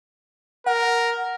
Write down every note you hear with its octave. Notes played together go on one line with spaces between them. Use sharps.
A#4 F#5